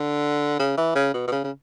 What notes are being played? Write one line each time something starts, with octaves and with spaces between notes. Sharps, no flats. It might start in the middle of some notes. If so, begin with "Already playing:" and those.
Already playing: D3
C#3
E3
C#3
B2
B2
C#3
C#3